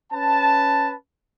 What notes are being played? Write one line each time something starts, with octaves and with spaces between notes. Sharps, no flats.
C#4 B4 A5